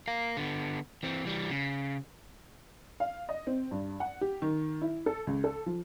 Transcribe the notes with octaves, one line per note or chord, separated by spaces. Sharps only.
A#4 F5
D3 B3
E3 C4
E3 G3
C#3
F5
D#5
C4
G2
F#5
G4
D#3
E4
A4
C#2
A4
F3